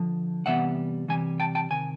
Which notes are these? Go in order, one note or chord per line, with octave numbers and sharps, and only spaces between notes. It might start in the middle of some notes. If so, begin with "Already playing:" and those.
Already playing: D3 F3
C3 E3 G3 B3 E5 F#5
C3 E3 G3 G#5
G5 A5
G5 A5
C3 D#3 G#5